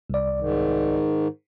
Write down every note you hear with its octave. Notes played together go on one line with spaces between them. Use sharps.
C2 D5
G#2 D#3